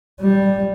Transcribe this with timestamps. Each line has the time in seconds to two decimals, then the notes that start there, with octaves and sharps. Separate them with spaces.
0.21 G3